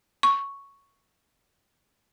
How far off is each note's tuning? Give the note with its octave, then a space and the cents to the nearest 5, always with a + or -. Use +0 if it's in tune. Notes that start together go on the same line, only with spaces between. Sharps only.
C#6 +0